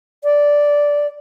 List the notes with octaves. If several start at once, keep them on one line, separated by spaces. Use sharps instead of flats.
D5